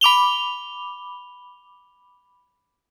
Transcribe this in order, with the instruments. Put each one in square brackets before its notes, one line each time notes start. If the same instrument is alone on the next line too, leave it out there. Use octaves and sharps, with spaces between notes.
[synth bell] B5 D6 F7 G7